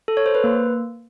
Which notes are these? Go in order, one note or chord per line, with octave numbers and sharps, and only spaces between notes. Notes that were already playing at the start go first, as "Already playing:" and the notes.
A4
C#5
C5
B4
A#3